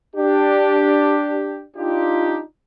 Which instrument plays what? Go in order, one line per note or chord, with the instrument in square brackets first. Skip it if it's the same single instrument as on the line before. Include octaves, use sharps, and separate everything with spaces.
[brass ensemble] D4 G4
D4 D#4 F4 G4